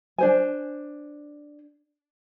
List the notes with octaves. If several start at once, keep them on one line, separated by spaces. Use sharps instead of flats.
D4 C5 G#5